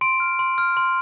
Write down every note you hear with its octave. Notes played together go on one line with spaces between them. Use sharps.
C6 D7
F6
C6
F6
C6